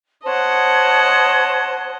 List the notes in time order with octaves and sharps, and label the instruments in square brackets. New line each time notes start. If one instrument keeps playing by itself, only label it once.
[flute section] C5 C#5 A5 [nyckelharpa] D#5 F#5